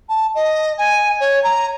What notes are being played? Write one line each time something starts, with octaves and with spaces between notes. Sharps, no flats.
A5
D#5
G#5
C#5
A#5